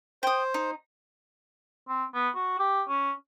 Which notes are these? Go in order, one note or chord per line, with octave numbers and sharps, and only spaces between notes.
C5 G5 D#6
D#4
C4
B3
F#4
G4
C#4